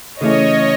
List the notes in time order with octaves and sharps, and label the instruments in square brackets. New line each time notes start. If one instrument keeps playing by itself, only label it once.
[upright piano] C#3 E3 A3 C#4 [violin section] C#5 D#5